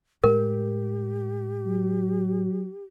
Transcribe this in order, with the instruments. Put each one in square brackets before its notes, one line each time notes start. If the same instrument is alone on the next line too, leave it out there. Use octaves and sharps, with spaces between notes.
[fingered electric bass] A2 G#3 [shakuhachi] G4 [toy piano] A#4
[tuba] F#3